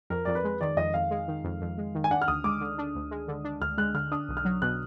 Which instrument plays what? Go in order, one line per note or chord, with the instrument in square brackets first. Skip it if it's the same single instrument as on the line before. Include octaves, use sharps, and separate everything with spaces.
[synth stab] F2 [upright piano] A#4
[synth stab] F2 [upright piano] D5
[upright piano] B4
[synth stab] G#3
[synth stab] D#3 [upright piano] D5
[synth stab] F2 [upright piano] D#5
[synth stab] F2 [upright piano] F5
[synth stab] G#3
D#3
F2
F2
G#3
D#3
[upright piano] G#5
[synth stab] D4 [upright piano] F#5
[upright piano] F6
[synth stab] D2 [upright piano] D#6
[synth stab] G#3 [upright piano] D6
[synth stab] D3
D4
D2
G#3
D3
D4
[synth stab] D2 [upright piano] F6
[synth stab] G#3 [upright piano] F#6
[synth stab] D3 [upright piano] F6
[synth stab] D4 [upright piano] D#6
[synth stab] B1
[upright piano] F6
[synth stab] F#3
[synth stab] B2 [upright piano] F#6